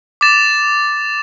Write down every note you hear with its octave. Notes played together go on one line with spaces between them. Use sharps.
D6 A6 E7